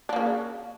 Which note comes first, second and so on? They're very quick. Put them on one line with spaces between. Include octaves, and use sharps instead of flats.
D4 A#3 C#3